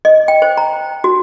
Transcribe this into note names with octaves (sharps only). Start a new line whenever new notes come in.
D#5
G5
C5
A#5
F#4